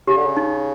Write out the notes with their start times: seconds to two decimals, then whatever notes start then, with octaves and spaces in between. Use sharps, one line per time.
0.07 C#3 G4
0.17 D3
0.25 C#3
0.37 D#4